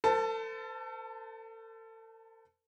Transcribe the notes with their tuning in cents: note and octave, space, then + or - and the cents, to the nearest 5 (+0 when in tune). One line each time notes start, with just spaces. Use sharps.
A4 +40 C5 -40 A5 +5